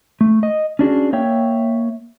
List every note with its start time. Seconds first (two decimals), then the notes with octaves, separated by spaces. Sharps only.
0.21 A3
0.43 D#5
0.79 C#4 D4 F#4 G#4
1.13 A#3 C#5 E5 G5